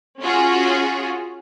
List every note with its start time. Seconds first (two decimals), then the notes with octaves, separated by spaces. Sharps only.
0.21 C#4 F4 F#4 G#4